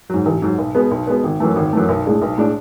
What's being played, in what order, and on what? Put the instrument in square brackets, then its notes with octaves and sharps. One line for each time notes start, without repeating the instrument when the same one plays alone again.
[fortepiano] G#2 F#3
A1
G#2 F#3
B1
B2 G#3 B3
B1
B2 G#3 B3
G#1
F#2 E3 A3
G#1
F#2 E3 A3
B1
A2 G#3 D4
B1
A2 G#3 D4